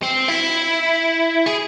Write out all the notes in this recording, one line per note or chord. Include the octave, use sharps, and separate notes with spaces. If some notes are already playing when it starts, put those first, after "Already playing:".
C4
E4
G#4